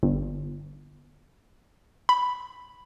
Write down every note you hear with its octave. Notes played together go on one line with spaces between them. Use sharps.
G1
B5